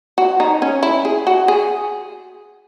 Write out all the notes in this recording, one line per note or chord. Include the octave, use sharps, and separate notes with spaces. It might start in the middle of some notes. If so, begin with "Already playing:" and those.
F#4
D#4
C#4
E4
G#4
F#4
G#4